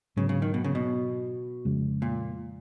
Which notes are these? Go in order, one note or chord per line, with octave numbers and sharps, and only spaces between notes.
G#2 C#3 F#3 B3
C#3
D#3
B2
C#3
B2
F2 C#3 F3 G#3
A#2